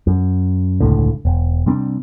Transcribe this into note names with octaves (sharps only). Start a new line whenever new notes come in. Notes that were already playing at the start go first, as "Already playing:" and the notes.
F#2
E1 C#2 A2 D3
E1
C3 G3 C4 D4